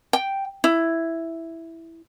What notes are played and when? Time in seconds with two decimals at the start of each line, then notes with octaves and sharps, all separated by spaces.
0.13 G5
0.64 E4